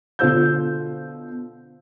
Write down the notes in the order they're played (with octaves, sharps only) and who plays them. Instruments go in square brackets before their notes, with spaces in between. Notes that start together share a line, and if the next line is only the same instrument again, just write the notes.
[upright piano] B2 D3 F4 C5 E6 G6